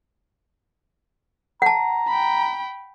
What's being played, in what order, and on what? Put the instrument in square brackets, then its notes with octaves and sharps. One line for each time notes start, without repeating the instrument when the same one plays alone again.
[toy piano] F#5 A5 [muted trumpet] A#5
[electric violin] G5 B5